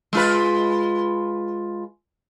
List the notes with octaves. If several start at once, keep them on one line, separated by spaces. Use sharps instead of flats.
G#3 F4 B4